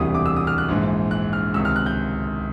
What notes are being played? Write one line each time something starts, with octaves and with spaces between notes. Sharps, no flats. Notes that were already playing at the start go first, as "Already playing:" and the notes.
Already playing: E1 D2 C3 E3 G3 D#6
D6
E6
D#6
F6
F#6
A#1 G#2 E3
F#6
F6
C#2 C3 D#3 E6
F6
F#6
G6